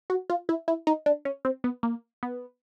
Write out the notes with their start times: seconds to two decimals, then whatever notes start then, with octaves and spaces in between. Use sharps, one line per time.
0.10 F#4
0.30 F4
0.49 E4
0.68 E4
0.87 D#4
1.06 D4
1.25 C#4
1.45 C4
1.64 B3
1.83 A#3
2.23 B3